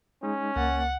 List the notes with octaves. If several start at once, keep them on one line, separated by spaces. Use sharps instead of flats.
G#3 C#4 D#4
C#2 A#3 F#5 A6